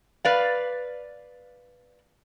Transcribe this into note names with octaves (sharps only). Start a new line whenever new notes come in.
B4 D5 F5